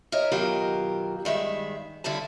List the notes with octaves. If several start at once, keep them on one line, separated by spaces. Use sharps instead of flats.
A#4 C#5 D#5 E5
B2 D#3 F#3 F4 G4 A#4
G2 D#3 G#3 E5
G2 D3 E4 A4 A5